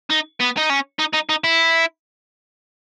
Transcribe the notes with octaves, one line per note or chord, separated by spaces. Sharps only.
D#4
B3
D#4
C#4
D#4
D#4
D#4
E4